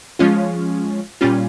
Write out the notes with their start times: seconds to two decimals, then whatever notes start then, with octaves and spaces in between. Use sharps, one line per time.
0.19 F3 G#3 C#4 F4
1.21 A#2 G3 C#4 F4